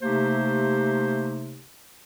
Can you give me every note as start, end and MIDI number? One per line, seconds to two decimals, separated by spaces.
0.02 1.60 48
0.02 1.60 57
0.02 1.60 58
0.02 1.60 63
0.02 1.60 67
0.02 1.60 72